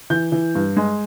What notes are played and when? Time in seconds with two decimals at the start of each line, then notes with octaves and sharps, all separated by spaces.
0.10 E3 G6
0.32 E3
0.55 G2
0.77 G#3